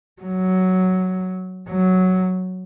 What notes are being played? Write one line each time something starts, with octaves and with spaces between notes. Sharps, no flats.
F#3
F#3